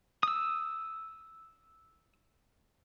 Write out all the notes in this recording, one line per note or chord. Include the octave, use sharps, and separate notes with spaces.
D#6 E6